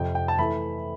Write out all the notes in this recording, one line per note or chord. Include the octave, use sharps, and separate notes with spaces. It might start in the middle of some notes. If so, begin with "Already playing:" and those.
Already playing: F2 C3 F3 G5
G5
A5
E3 A3 E4 B5